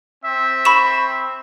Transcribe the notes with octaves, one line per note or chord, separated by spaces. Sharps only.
C4 E5
B5 C#6 E7